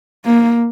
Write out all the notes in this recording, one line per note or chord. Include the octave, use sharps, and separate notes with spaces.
A#3